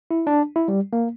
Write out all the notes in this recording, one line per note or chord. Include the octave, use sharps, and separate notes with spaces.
E4
D4
E4
G3
A#3